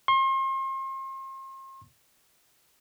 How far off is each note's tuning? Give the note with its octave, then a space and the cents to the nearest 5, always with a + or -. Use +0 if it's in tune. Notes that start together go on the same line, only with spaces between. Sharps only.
C6 +40